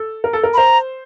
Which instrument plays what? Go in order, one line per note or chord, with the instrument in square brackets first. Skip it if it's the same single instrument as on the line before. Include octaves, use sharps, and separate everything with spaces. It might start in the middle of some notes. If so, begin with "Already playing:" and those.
Already playing: [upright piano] A4
A#4
A4
A#4
[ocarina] B5
[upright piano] C5 [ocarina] A#5